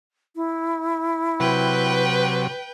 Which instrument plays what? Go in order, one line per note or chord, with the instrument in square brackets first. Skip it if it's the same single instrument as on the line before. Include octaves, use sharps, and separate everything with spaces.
[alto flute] E4
[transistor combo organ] C3 F#3 [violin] B4 G5